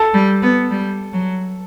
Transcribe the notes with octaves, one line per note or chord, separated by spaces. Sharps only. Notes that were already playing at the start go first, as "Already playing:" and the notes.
Already playing: A4 A5
G3
B3
G3
F#3